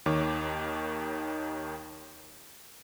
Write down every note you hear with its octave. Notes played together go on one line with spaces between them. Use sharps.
D#2 D#3 C#5 D6